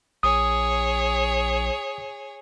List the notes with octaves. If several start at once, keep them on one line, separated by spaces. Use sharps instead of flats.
A#1 G#4 C#5 D#6